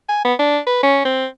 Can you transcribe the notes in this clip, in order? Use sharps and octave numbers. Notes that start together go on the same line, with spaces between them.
G#5
B3
D4
B4
C#4
C4